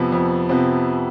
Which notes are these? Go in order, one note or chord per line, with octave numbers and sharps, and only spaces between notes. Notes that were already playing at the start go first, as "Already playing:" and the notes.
Already playing: F2 C3 F3 B3
F2
C3 F3 B3